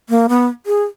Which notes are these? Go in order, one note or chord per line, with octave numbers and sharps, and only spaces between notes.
A#3
B3
G#4